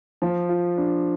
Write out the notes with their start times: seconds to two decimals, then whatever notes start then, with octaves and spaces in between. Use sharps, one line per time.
0.22 F3
0.49 F4
0.77 D4